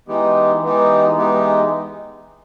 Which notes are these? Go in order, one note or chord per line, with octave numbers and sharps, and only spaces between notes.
E3 G#3 B3 D#4 G4
E3 G#3 B3 D#4 G4
E3 G#3 B3 D#4 G4